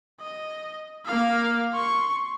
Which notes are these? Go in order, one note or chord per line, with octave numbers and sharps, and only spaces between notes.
D#5
A#3 F5
C6 C#6